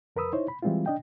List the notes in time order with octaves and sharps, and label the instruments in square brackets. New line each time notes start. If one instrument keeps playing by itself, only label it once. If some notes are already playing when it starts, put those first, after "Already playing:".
[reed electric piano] F2 A#4 B4 B5 D#6 E6
D#4 E4 C5 C#5
B5
E3 G3 G#3 C4 E4 F4
D4 D#5 G5